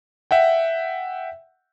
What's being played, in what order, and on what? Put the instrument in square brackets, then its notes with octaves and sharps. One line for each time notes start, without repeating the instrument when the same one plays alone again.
[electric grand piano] E5 F#5 G5